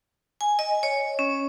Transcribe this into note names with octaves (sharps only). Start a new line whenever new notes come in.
G#5
D#5
C#5
C#4